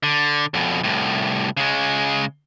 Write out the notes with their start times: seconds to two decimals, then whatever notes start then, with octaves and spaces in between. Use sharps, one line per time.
0.03 D3
0.54 F2 B2
0.83 C2 A2
1.57 C#3 G#3